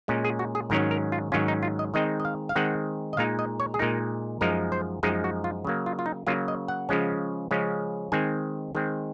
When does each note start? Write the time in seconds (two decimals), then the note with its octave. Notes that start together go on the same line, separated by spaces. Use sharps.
0.08 A#2 G#3 C#4
0.25 G#4
0.39 F#4
0.55 G#4
0.70 G#2 D#3 F#3 C#4 A#4
0.91 A#4
1.12 F4
1.32 G#2 D#3 F#3 C#4 F4
1.48 D#4
1.63 F4
1.79 D#5
1.94 D#3 G#3 C4 D#4 D#5
2.20 D#5
2.25 F5
2.49 F5
2.56 D#3 G#3 C4 D#4 F#5
3.13 D#5
3.17 A#2 G#3 D#4 F5
3.39 D#5
3.60 C#5
3.74 G#4
3.79 A#2 G#3 D#4 A#4
4.41 F#2 F3 G#3 D#4 A#4
4.72 C5
5.03 F#2 F3 G#3 D#4 G#4
5.24 F#4
5.44 F4
5.65 C#3 F#3 A#3
5.86 F4
5.99 F4
6.06 D#4
6.27 C#3 F#3 A#3 F4
6.48 D#5
6.68 F#5
6.89 C#3 F3 G#3 C#4
7.51 C#3 F3 G#3 C#4
8.12 D#3 G#3 C4 G#5
8.75 D#3 G#3 C4